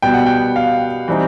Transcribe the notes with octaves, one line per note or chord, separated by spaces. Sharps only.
B2 G3 B3 G5
F#5
G5
F5
E3 G3 C4 D#4